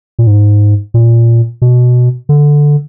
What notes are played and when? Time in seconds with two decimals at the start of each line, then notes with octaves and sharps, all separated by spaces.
0.19 A#2
0.27 G#2
0.94 A#2
1.62 B2
2.29 D3